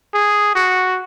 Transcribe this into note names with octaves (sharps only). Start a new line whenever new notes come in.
G#4
F#4